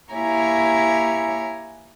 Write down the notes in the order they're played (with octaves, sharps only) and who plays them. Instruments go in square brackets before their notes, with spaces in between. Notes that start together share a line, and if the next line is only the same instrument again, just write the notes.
[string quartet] A#3 E4 G4 C#5 G#5 A#5